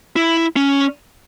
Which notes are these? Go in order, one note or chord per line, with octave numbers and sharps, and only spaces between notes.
E4
C#4